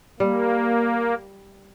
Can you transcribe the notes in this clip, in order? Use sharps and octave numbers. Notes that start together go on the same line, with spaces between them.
G3 A#3